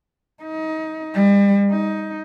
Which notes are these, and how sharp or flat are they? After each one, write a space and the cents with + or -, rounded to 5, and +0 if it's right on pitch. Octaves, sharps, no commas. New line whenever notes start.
D#4 +25
G3 +40
D#4 +15